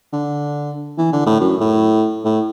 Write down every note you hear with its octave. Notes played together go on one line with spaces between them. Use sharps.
D3
E3
D3
A2
F#2
A2
A2